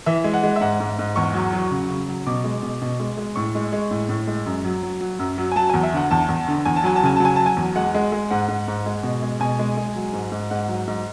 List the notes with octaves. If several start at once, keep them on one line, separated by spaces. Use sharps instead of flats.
E3 E5
G#3
F#5
G#3
E5
G#2 F#5
G#2
G#2
E2 C#6
F#3
F#3
C#3
C#3
F#3
B2 D6
G#3
B2
B2
G#3
G#3
A2 C#6
G#3
G#3
A2
A2
G#3
F#2
F#3
F#3
F#3
F#2
F#3
G#5
F#3 A5
E2 G#5
E5
D3 F#5
E2 A5
E2
D3
E2 G#5
A5
F#3 G#5
A5
C#3 G#5
F#3 A5
G#5
F#3 A5
G#5
E2
G#3 F#5
G#3
G#3
G#2 F#5
G#2
G#2
G#3
B2
G#3
B2 G#5
G#3
G#3
F#3
G#2
G#2
G#2 F#5
F#3
G#2